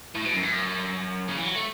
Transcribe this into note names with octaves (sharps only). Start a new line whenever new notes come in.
A2
B2
F#2
A2
F#2
C#3
E3
F#3
A3